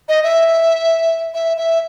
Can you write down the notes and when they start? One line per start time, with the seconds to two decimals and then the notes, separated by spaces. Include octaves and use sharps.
0.09 D#5
0.23 E5
1.34 E5
1.57 E5